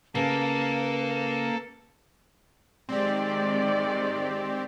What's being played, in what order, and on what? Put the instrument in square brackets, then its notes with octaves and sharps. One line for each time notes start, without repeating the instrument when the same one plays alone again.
[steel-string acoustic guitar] C#3 [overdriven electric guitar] A#3 [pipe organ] A4 [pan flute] B4
[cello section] D#3 G#3 D5 [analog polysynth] C4 G4